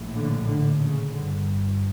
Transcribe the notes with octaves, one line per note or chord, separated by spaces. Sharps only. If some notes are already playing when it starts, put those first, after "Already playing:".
Already playing: A#1 A2
D3
D3
C#3
G1 G2 D3